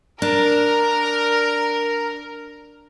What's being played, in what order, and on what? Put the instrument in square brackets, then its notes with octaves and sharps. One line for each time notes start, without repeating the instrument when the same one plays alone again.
[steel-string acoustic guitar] D4 [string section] A#4